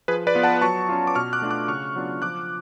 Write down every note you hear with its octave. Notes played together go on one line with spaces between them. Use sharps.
F3 G#4 B4
B4 D5
B3 F4
F#5 A5
F#3 A5 C#6
C#4 F4
D6
B2 C#6 F6
D6 F#6
A3 D4 F4
D6 F#6
C#3 C#6 F6
F#3 B3 D4 F4
F3 D6 F#6